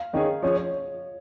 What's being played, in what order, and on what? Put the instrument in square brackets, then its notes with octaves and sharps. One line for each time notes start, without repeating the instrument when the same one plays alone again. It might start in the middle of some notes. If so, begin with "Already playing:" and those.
Already playing: [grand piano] F5
[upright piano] D#3 C#4 G#4 [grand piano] D#5
[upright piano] F3 C#4 G#4 [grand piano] C#5
[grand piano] C#5